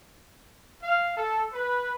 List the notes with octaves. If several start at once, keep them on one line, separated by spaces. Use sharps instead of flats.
F5
A4
B4